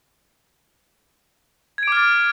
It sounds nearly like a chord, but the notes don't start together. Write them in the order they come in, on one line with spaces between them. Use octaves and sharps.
G#6 D7 D6 F6 A6